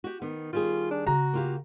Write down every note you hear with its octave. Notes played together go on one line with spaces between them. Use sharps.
F#4 G4
D#3 B3
D#3 G3 F4 G#4
D4
C#3 F#4 A#5
A#3 F4 G4